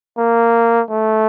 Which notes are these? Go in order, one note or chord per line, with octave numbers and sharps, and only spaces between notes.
A#3
A3